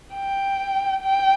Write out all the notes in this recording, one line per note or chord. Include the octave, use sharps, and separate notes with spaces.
G5
G5